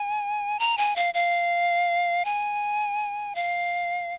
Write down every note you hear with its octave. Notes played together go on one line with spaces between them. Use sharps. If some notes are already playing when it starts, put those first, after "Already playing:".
Already playing: G#5
A#5
G#5
F5
F5
G#5
F5